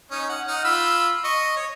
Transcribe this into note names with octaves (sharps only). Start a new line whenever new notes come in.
C#4 D#4
F#5
D#4 F#5 F6
F4 B5 E6
D#5 C#6
C#5